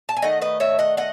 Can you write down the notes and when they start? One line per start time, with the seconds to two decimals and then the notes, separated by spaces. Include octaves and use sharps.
0.09 A5
0.16 G#5
0.22 D#3 A3 D#5 F#5
0.42 B4 D#5
0.60 C#5 E5
0.79 D#5 F#5
0.97 D#5 F#5